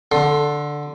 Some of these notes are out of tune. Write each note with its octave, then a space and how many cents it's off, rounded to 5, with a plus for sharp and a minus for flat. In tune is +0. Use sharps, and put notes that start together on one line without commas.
D3 +0 C6 +25